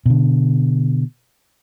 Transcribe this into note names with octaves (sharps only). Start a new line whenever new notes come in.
B2 D3